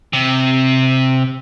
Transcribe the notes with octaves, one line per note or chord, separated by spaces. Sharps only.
C3